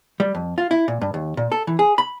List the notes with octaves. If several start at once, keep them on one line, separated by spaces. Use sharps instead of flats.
G3
F2
F4
E4
A#2
G2
D#2
A#2
A4
E3
G#4
B5